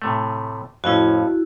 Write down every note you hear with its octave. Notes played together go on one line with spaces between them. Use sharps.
A2 C3 A3
F2 A2 C#4 E4 F#4